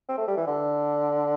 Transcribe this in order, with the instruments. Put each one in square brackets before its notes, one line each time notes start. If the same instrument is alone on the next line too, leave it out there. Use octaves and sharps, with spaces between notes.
[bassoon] C4
A3
G3
E3
D3